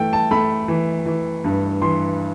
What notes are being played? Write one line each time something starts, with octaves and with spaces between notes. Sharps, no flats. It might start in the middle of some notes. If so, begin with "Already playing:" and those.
Already playing: E3 A3 G5
A5
A3 B5
E3
E3
G2
E3 C6